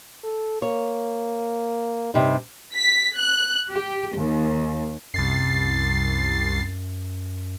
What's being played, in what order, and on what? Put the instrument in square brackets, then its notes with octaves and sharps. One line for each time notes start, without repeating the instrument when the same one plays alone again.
[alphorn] A4
[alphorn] A#3 [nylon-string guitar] C#5
[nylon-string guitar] G2 C3 D#4 [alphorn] G3
[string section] B6
F#6
G4
D#2
[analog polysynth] C2 A6 C7 [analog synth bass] F#2